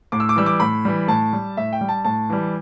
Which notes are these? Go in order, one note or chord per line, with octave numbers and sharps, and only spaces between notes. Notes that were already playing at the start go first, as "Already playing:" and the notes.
A2 D6
E6
D6
E3 G3 E6
D6
A2 B5
E3 G3
A2 A5
G3
A2 E5
G5
G3
A5
A2 A5
E3 G3